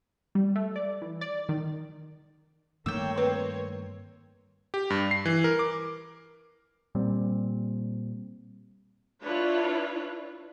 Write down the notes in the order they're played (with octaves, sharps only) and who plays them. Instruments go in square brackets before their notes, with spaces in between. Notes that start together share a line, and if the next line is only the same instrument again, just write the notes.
[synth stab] G3
A3
D5
E3
D5
D#3
[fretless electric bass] G2 D#3 A3 [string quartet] A#3 C#5 [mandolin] G5 E6
[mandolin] C4 [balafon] B4
[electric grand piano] G4
G2
C7
E3
A#4
D6
[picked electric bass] A#2 G3 C4
[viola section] D4 E4 F4 B4 C#5